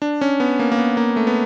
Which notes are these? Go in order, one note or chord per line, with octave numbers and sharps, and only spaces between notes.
D4
C#4
B3
A#3
A#3
B3
A#3
A3
B3